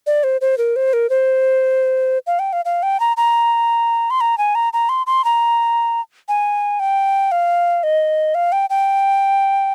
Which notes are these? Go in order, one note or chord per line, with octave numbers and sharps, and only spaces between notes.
D5
C5
C5
A#4
C5
A#4
C5
F5
G5
F5
F5
G5
A#5
A#5
C6
A#5
G#5
A#5
A#5
C6
C6
A#5
G#5
G5
F5
D#5
F5
G5
G5